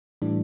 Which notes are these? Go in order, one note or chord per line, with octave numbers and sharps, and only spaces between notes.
A2 E3 G3 D4